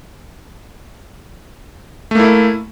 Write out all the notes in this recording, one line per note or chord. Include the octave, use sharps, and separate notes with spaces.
A3 A#3 E4